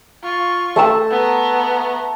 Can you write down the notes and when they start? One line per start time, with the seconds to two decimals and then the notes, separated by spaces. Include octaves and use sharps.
0.23 F4 C#6
0.76 A3 A5 E6
1.11 B3 A#5